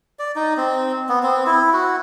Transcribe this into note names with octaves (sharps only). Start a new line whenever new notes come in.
D5
D#4
C4
B3
C4
E4
F#4